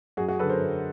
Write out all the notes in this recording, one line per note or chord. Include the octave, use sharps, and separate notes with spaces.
F#2 F#4 G#4
F#4 G#4
D3 F#3 A4 B4
A#4 C5
F#2